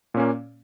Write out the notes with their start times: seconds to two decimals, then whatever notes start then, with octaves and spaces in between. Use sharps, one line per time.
0.14 A#2
0.17 C#4
0.20 A#3